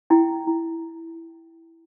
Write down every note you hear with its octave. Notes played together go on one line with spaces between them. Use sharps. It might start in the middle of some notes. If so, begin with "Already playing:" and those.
E4 G5
E4